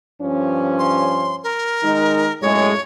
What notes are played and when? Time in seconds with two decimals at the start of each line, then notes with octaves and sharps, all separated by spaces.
0.22 G2 F3 C#4
0.79 C6
1.43 A#4
1.83 D#3 G#3 D#4
2.42 F#2 A2 G#3 C#5